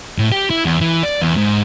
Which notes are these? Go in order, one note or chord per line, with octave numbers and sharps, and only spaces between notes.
A2
G4
E4
E2
E3
D5
E2
G#2